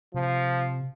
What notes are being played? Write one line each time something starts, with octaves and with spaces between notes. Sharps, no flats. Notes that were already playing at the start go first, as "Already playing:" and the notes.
C3 F3